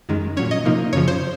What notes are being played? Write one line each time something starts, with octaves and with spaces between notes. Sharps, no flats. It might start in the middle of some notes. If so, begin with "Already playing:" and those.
F#2 D#3 G#3
A#2 F#3 C#4 C#5
D#5
C3 F3 A#3 D#4
F#2 C#3 F3 C#5
C5